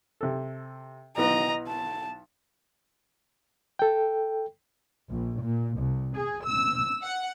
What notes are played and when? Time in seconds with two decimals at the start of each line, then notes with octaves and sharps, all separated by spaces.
0.21 C3 A4
1.17 B1 E3 B3 D#5 A#5
1.68 A5
3.79 A4 G5
5.10 A#1
5.42 A#2
5.79 C2
6.16 G#4
6.47 E6
7.02 F#5